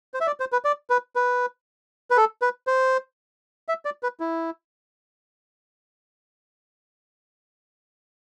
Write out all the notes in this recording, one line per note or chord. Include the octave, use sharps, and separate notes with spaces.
C5
E5
D5
C5
B4
D5
B4
B4
B4
A4
B4
C5
E5
D5
B4
E4